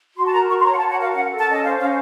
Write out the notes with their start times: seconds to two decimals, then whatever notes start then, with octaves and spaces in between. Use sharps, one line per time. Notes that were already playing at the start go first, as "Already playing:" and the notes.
0.16 F#4 C6
0.26 A5
0.33 A#4 A#5
0.49 F#4 C#6
0.59 C6
0.65 C#5 A#5
0.73 F#5
0.77 A5
0.81 F#4
0.90 F#5
0.97 A#4 F5
1.14 C#4 F#5
1.30 A4
1.38 A5
1.46 C#4
1.52 D#5
1.62 C5 F5
1.79 C#4 F5